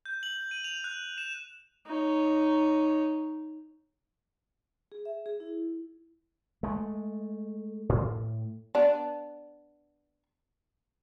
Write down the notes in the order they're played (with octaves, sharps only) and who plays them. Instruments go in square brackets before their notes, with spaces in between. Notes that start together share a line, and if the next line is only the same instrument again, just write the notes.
[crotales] G6
F#7
D#7
F7
F#6
E7
[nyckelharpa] D#4 C#5
[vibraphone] G#4
E5
G#4
E4
[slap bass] G#3 A3
A2
[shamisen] B3 D4